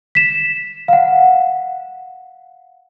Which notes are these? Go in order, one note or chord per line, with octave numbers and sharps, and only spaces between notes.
B6 E7
F5 F#5